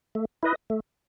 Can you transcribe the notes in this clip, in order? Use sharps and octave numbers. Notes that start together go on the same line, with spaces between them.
A3
E4 B4 D#5
A3